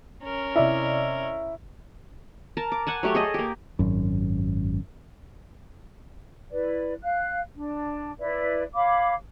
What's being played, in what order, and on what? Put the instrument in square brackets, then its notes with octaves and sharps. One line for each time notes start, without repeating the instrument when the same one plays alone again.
[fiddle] C#4 A#4
[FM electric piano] C3 D5 D#5 [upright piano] E4
[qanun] A#4 A5
D6
F#5 G#5 A5
F#3 A3 G4 C#5
G#4 A4 D#5
A#3 G4
[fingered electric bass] G#1 F#2
[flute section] E4 B4 D5
F5 F#6
D4
E4 B4 D5 E5
C#5 F5 B5 D6